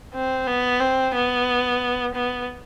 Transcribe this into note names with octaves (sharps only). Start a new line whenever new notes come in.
C4
B3
C4
B3
B3